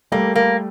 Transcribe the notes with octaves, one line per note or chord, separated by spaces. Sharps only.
G3 A3 A#3
A#3